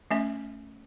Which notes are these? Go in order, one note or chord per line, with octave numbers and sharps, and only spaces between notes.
A3 C#4 E5